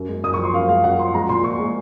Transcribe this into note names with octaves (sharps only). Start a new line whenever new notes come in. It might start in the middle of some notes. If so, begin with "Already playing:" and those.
Already playing: F#2
G#3
F#2 D#6
C#6
F3 C6
F#2 F5
G#3 F5
F#2 F#5
F3 C6
G#3 A#5
A#2 C6
A#2 C#6
G#3